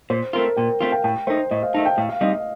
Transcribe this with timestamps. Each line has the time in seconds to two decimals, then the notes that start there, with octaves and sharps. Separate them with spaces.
0.10 A#2 C5
0.33 A3 C4 F4 A#4
0.57 A#2 G5
0.81 A3 C4 F4 F5
0.92 G5
1.04 A2 G5
1.27 A3 C5
1.30 D#4
1.51 A2 D#5
1.63 F5
1.74 A3 D#4 A5
1.86 G5
1.97 A2 F5
2.09 F5
2.21 G3 C4 D#4 D#5
2.33 F5